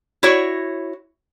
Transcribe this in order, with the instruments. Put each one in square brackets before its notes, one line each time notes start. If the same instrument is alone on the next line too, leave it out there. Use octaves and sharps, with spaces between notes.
[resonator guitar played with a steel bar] E4 F#4 C#5